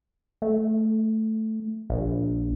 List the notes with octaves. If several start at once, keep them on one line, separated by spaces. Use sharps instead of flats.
A3
A#1